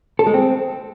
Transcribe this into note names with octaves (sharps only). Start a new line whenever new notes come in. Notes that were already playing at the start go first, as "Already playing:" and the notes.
A4
G#3
C4